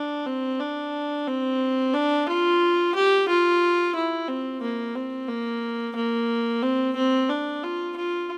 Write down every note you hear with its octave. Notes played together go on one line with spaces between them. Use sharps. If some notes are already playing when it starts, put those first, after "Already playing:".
Already playing: D4
C4
D4
C4
D4
F4
G4
F4
E4
C4
A#3
C4
A#3
A#3
C4
C4
D4
F4
F4